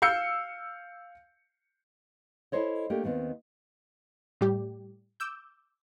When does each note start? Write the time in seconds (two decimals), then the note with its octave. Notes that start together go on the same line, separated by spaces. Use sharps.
0.02 F5 E6 G6 C#7
2.52 E4 A4 C5 C#5 D#5
2.90 A3 A#3 D4 G4
3.04 D#2 D#3 B3 C4
4.41 A2 G3 G4
5.20 D6 E6 G6